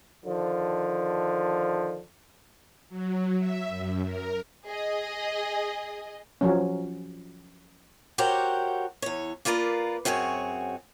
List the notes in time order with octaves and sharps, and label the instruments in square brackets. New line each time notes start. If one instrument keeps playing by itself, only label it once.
[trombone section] D3 D#3 F3
[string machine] F#3
E5
F#2
A#4
[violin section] G#4 D#5
[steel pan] F3 F#3 C#4
[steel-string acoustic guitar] F#4 G4 A#4 C5 C#5 F#5
E2 C#5
A#3 F4 A#4 B4 D5
F#2 C4 F#4 G#4 C#5